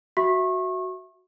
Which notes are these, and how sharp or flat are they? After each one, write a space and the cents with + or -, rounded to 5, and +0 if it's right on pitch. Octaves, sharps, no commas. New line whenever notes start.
F#4 +0 E5 +0 C#6 -30